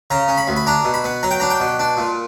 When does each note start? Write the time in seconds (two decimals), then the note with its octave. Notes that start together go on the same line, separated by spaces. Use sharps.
0.10 C#3 A#5
0.28 C#4
0.38 B5
0.48 D2
0.56 B5
0.67 D4 A#5
0.84 B2
0.94 B5
1.04 B3
1.23 F#3 A#5
1.31 G5
1.40 D4 A#5
1.50 G5
1.60 B2
1.79 D4
1.97 A#2